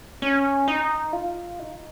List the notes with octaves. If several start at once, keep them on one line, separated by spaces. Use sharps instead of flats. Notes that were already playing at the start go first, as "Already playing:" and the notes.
C#4
D#4
F4
D#4